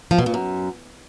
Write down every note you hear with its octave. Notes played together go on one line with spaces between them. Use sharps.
F3
B2
A#2
F#2